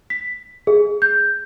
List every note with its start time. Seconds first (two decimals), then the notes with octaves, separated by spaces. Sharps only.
0.10 B6
0.67 G#4
1.02 G6